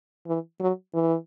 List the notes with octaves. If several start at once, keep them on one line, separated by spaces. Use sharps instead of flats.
E3
F#3
E3